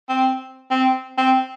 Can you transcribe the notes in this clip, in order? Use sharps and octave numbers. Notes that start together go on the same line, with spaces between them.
C4
C4
C4